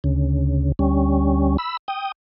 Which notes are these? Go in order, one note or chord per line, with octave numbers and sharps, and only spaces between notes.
D2 C#3
D2 G3 C#4
B5 E6
G5 D#6